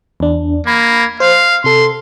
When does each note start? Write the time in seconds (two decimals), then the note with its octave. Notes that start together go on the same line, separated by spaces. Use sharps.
0.20 E2 D4
0.67 A#3 B5 G#6
1.20 C5 F5
1.64 C3 A4 C6